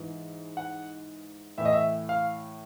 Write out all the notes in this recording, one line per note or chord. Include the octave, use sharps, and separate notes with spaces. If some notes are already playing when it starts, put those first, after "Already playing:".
Already playing: G#2 E3
F#5
A2 E3 E5
D#5
E5
F5